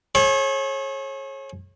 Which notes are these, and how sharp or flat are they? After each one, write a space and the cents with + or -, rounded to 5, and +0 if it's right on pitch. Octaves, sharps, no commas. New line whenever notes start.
G#4 +35 C#5 -35